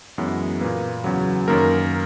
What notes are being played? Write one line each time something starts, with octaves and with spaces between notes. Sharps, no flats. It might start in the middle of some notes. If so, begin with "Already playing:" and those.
F#2 E3 G#3 B3
A#2 A#3 B4
E2 C#3 F#3
F#2 D#3 A#3 A#4